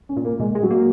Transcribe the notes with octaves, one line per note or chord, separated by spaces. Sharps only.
C#4
A#2
A#3
A#2 G#3
G#3
F#3
A#3